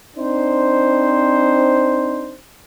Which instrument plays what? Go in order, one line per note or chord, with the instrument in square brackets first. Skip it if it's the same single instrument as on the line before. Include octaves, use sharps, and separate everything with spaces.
[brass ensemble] C4 D4 D#4 C5